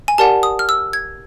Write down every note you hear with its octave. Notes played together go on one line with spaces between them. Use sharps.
G#5
G4 A#4 D5 F#5 A5
D#6
F6
E6
G#6